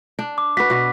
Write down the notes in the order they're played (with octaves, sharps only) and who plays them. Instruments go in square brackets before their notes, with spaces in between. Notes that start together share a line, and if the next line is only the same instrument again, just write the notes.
[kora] D4
[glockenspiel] D6
[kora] F#4 B4 [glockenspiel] B6
[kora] B2 F#4